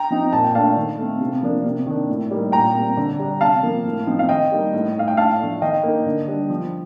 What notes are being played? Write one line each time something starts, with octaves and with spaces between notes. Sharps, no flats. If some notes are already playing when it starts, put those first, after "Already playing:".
Already playing: G5 A#5
F3 C4 D#4
A#2 A5
G5
A3 D4 F5 A5
D#3
A3 C4
C3
F3 A#3 D4
C3
D#3 A#3 D4
A2
G3 A#3 D#4
A#2 G5 A#5
G3 C4
D3
G3 D4
C3 F5 A5
F3 A#3
A2
F3 C4 D#4
F5
D#3 D#5 G5
G3 A#3 D#4
A2
A3 D#4 F5
G5
A2 F5 A5
F3 A3 D4
D#3 D#5 G5
A#3 D#4
D3
G3 D4
F3